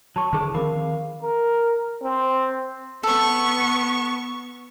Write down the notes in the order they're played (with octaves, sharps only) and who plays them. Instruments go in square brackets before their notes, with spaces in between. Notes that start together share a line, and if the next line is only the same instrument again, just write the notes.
[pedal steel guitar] F#3 C#6 [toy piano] A5
[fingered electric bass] D3 [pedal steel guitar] E3 A5 D6 [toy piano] G#4 C5
[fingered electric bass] D#3 F3 C4 [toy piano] A#4 B5 D6 [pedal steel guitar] F5
[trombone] A#4
C4
[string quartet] B3 C#6 [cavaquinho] A4